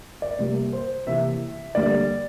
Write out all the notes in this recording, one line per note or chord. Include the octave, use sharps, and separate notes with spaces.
D5
C3 G3 A#3
C5
C3 E3 A#3 E5
D3 G3 A#3 D5